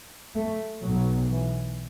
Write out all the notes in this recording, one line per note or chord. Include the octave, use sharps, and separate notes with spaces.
A3
B1 B2 F#3
E3